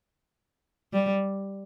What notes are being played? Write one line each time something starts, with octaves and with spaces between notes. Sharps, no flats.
G3